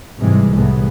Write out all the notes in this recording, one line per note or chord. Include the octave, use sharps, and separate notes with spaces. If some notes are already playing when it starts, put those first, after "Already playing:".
G#2 C3 E3 G3 G#3
C2 A2 E3 G#3 A3 B3